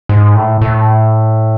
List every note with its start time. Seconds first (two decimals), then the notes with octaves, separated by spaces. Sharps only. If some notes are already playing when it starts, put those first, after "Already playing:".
0.09 G#2
0.36 A2
0.61 A2